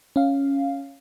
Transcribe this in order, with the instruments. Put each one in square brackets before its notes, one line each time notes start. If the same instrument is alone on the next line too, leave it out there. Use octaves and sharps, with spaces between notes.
[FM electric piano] C#4 F5